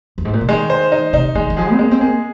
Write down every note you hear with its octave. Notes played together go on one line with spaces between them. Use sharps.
F2
G#2
A#2
C3
D#3 G#3
C5
D#4
C3 D#4
D#3 G#3
D#3
F3 G#4
C4
G#3 A#3
C4
A#3 G#4